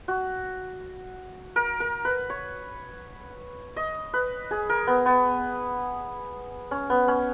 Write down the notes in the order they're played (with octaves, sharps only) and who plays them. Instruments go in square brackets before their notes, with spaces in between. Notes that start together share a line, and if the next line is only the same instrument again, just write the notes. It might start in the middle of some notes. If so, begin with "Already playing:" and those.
[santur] F#4
A#4
A#4
B4
C#5
D#5
B4
G#4
A#4
B3
B3
C#4
B3
C#4